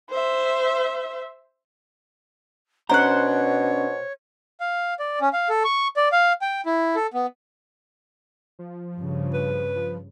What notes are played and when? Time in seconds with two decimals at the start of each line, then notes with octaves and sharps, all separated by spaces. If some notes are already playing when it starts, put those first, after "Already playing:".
0.10 C5 E5
2.90 B2 C#4 D4 C5 C#5 F#5 A#5
4.60 F5
4.99 D5
5.21 C#4
5.33 F5
5.49 A4
5.65 C#6
5.96 D5
6.12 F5
6.41 G5
6.66 E4
6.95 A4
7.14 B3
8.59 F3
8.96 G2 C#3
9.33 B4
9.76 F3